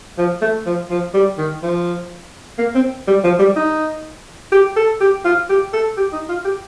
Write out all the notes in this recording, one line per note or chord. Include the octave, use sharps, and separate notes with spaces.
F3
A3
F3
F3
G3
D#3
F3
A#3
C4
G3
F3
G3
D#4
G4
A4
G4
F4
G4
A4
G4
D#4
F4
G4